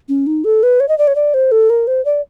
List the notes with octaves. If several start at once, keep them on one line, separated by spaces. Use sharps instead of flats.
C#4
D#4
A4
B4
C#5
D#5
D5
C#5
D5
C5
A4
A#4
C5
D5